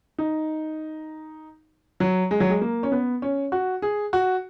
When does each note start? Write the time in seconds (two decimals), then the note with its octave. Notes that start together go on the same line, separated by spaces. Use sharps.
0.18 D#4
2.00 F#3
2.31 G#3
2.40 F#3
2.50 G#3
2.61 A#3
2.83 C#4
2.92 B3
3.22 C#4
3.52 F#4
3.82 G#4
4.13 F#4